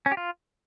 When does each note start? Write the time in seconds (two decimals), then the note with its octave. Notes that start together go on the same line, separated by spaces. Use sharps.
0.06 C#4
0.12 G4
0.17 F4